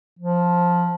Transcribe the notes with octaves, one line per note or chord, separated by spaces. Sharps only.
F3